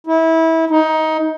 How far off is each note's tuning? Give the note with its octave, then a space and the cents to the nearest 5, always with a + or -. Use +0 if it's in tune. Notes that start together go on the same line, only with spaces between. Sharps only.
E4 -25
D#4 +20